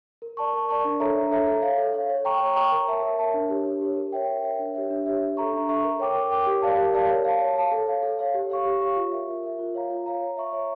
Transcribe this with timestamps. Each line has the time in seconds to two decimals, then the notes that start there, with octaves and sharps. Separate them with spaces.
0.22 A#4
0.37 D5 A5 C#6
0.53 A#4
0.69 D5 A5 C#6
0.85 D4
1.00 A4 C#5 E5 A#5
1.16 D4
1.31 A4 C#5 E5 A#5
1.47 A4
1.62 C#5 F5
1.78 A4
1.94 C#5 F5
2.10 C#5
2.25 G5 A#5 C#6
2.40 C#5
2.56 G5 A#5 C#6
2.72 A#4
2.88 C#5 E5 A5
3.03 A#4
3.19 C#5 E5 A5
3.34 D4
3.50 G4 C#5
3.65 D4
3.81 G4 C#5
3.97 A#4
4.12 C#5 E5 G5
4.27 A#4
4.44 C#5 E5 G5
4.59 D4
4.74 G4 C#5 E5
4.90 D4
5.06 G4 C#5 E5
5.22 D4
5.37 A4 E5 A#5 C#6
5.53 D4
5.69 A4 E5 A#5 C#6
5.84 A#4
6.00 C#5 G5 D6
6.15 A#4
6.31 C#5 G5 D6
6.47 G4
6.62 A#4 D5 F5 A5
6.77 G4
6.93 A#4 D5 F5 A5
7.09 C#5
7.25 F5 A5
7.40 C#5
7.56 F5 A5
7.72 A4
7.87 C#5 F5
8.03 A4
8.19 C#5 F5
8.34 G4
8.50 C#5 F5 C#6
8.66 G4
8.81 C#5 F5 C#6
8.96 F4
9.12 A#4 E5
9.28 F4
9.43 A#4 E5
9.59 F4
9.75 C#5 F5 A#5
9.90 F4
10.06 C#5 F5 A#5
10.21 C#5
10.37 E5 A#5 C#6
10.53 C#5